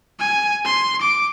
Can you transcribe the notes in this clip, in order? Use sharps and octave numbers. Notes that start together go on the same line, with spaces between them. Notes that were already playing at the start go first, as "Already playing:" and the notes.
G#5
C6
D6